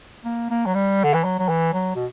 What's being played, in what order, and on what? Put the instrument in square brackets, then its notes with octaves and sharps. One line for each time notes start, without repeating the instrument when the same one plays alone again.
[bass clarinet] A#3
A#3
F#3
G3
D3
E3
F#3
F#3
E3
F#3
B2